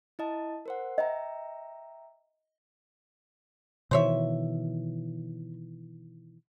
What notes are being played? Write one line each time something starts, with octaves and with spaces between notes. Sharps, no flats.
E4 D#5 A5
A#4 C5 F#5
D#5 E5 G5 A#5
B2 D#3 E3 C5 C#5 E5